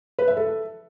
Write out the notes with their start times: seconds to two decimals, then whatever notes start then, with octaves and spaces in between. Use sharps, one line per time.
0.19 B4
0.28 E5
0.37 A4